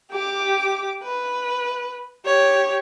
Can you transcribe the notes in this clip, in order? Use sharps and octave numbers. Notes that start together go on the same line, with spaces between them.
G4 D6
B4
G4 C#5